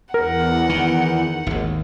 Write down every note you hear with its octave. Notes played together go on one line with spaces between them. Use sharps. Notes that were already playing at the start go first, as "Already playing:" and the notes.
E2 A#4 F#5
D#3
G#1 D#2